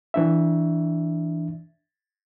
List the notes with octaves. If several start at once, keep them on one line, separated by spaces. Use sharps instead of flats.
E3 D4 E5